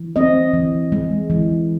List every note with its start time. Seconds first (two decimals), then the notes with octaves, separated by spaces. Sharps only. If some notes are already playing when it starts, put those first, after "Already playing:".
Already playing: E3
0.16 C4 D#5
0.54 E3
0.92 G#3
1.30 E3